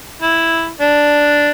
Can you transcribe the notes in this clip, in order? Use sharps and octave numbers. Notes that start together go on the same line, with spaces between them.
E4
D4